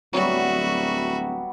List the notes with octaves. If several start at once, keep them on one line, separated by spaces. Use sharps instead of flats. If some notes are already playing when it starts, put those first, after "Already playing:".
D1 F#3 G3 B3 F#4 E5